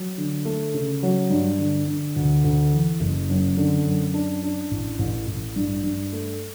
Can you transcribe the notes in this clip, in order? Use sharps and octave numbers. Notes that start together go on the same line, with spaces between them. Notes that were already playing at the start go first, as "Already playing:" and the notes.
Already playing: F#3
D3
A3
C#3
F#3
G2
D3
D3
D2
D2
E3
F#1
F#2
D3
F#2
D4
D4
A1
A1
A1
G2
G2
A3